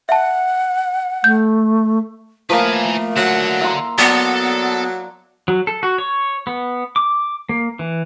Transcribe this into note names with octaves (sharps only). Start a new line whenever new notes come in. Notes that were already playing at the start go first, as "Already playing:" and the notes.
E5 F#5 A5
A3 G6
F3 A3 A#3 B4 F5 G#5
D3 F#3 F#5
E5 A#5 C6
F#3 B3 A4 D5
F#3
A4
F#4
C#5
B3
D6
A#3
E3